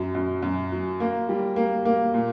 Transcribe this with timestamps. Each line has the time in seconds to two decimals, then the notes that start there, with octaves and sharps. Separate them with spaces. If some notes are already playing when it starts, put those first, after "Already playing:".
Already playing: F#2 F#3
0.15 F#2
0.43 F#2
0.72 F#3
1.00 A#3
1.29 G3
1.56 A#3
1.85 A#3
2.14 A#2